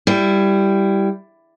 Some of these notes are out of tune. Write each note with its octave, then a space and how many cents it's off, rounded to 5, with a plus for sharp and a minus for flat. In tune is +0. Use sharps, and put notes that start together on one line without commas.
G3 +0 E4 +15